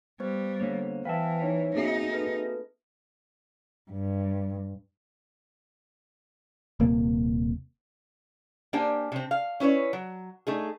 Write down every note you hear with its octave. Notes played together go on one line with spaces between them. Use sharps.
G3 B3 C5
D3 A#3 C#5
E3 B4 E5 F5 G5 A5
D#4 C#5
A#3 C4 D#4 F#4 G#4 E5
A4 B4
G2
D#1 C3 A#3
A#3 D4 G4 C5 G5 G#5
C3 C4
F5
C#4 E4 B4 C#5
F#3
A3 D#4 G#4